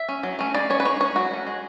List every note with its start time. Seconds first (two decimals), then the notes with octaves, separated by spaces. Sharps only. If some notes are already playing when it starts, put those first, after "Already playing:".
Already playing: E5
0.09 C#4
0.23 F#3
0.39 A3 C#4
0.54 G#3 D5
0.70 C#4 C#5
0.80 B4
0.85 G#3 C#5
1.00 C#4 C#5
1.16 F#3 F#4
1.31 A3 C#4
1.47 G#3